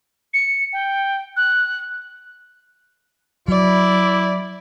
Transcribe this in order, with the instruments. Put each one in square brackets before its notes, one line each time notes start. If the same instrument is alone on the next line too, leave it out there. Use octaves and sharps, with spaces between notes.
[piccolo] C#7
G5
F#6
[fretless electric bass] F#3 [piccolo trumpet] E4 [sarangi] D5